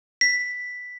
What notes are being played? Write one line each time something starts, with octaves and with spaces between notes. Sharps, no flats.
B6